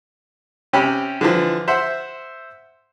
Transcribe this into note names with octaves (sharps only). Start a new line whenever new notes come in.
C3 C#4 G4 G5 B5
D3 E3 F3
C5 E5 F#5